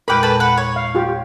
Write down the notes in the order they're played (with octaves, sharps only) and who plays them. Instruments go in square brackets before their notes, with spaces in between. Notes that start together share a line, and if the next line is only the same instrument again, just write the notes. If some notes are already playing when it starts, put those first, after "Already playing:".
[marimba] E2 A#2 G#3 [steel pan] A#4 G5 D6 [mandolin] B4 B5
[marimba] A4 C#6 [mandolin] B4 [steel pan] A5
[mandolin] B4 F#5
C#5
[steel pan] F5
F4 G4